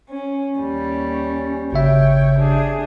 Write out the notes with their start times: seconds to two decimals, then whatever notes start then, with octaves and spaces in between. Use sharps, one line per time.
0.10 C#4
0.59 D#2 G3 C#4
1.72 G#1 C#3 C#5 E5 G5
2.38 D4 G4 G#4